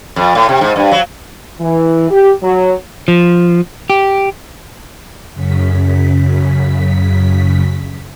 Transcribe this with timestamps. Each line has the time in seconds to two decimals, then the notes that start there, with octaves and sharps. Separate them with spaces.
0.16 F2
0.35 A2
0.49 C3
0.61 G#2
0.76 G2
0.91 F#3
1.60 E3
2.10 G4
2.42 F#3
3.08 F3
3.90 G4
5.34 F#2 C#3 B6